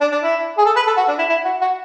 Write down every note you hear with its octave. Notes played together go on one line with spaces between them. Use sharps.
D4
D4
E4
G#4
A4
B4
A4
F#4
D4
E4
E4
F#4
F#4